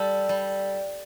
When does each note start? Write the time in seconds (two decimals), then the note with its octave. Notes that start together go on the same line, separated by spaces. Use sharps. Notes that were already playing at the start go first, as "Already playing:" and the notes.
Already playing: G3 A4
0.29 G3